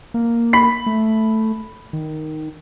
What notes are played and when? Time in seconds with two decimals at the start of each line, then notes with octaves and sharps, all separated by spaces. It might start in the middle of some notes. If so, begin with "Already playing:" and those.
0.14 A#3
0.53 B5 B6
0.86 A3
1.93 D#3